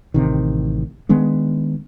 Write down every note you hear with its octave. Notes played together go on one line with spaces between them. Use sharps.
A1 C3 D#3
D#3 G#3 B3 D4